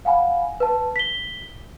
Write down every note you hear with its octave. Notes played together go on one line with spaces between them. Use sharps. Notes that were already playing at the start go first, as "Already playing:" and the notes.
F5 F#5 G#5 B5
B4 A5
B6 G7